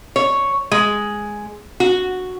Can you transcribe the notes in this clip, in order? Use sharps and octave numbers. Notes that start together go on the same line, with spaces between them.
C#5
G#3
F#4